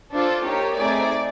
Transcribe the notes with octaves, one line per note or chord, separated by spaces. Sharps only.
D4 F4 A4 C5
A#3 D#4 G4 C#5
A3 C4 D#4 G#4 D5